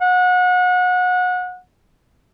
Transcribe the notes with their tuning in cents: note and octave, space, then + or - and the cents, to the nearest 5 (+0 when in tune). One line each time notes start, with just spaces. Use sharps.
F#5 -30